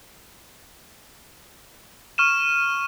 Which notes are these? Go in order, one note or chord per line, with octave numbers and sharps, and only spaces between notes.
C#6 F6 D#7 E7